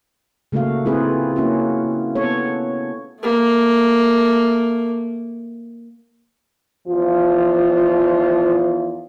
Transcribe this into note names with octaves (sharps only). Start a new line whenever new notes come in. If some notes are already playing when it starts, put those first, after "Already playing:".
C#3 A3 A#3 F#4 F5
A3 C4 E4 F4 G#4 B4
A#3 C#4 E4 F#4
B3 A4 C#5
A3 A#3
E2 F3 F4